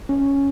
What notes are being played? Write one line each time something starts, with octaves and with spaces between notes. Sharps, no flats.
C#4